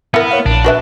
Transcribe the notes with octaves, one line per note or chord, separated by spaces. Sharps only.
B3 E4 A#4
C#5 F5
A#1 D4
F#4 B4 E5